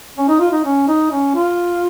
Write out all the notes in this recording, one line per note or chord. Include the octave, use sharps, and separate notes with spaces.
C#4
D#4
F4
D#4
C#4
D#4
C#4
F4